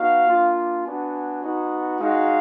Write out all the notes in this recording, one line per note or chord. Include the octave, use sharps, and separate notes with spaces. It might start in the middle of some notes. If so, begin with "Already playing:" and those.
Already playing: B3 D#4 F#4 F5
A#3 D4 F4
B3 D4 F#4 G#5
B3 D#4 F#4
G#3 D#4 F#4 F5